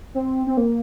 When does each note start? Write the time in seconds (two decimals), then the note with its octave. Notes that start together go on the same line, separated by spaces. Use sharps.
0.15 C4
0.47 C4
0.57 A#3